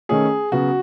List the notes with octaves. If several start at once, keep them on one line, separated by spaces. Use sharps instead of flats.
D#3 A3 C#4 G#4
C#3 F#3 B3 F#4